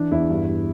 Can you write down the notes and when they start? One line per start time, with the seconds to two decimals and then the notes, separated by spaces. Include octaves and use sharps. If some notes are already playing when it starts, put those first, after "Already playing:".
Already playing: E3 D4
0.11 E2 E4
0.30 G2
0.47 G2